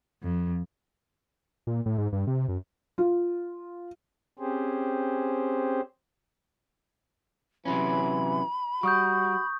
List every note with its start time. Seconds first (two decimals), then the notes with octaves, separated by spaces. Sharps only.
0.23 F2
1.67 A#2
1.86 A2
1.98 G#2
2.13 G2
2.27 C3
2.48 F#2
2.98 F4
4.39 C4 C#4 G4 G#4 C5
7.65 C3 E3 F#3 C#4 B5
8.83 G3 F#4 C#6 D#6 G6